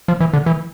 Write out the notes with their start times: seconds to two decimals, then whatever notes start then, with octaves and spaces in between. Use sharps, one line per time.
0.08 F3
0.20 E3
0.33 D3
0.46 E3